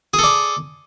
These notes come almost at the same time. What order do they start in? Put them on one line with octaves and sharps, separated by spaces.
G#4 A4 D5